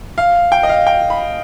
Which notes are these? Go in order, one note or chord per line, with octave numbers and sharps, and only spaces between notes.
F5
G5
D#5
F5
G5
B5